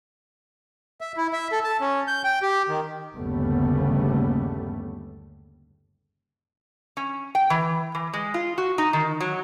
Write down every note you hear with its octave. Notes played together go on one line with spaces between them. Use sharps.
E5
E4
E5
A4
A5
C#4
G6
G5
G4
D#3
G1 D#2 C#3 G3 A3 B3
C#4
G5
E3
E3
G#3
F4
F#4
D#4
D#3
F#3